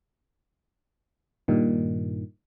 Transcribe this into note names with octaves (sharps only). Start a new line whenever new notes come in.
G2 A#2 D#3